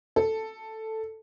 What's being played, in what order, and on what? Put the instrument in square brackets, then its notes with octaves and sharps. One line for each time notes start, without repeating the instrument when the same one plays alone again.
[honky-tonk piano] A4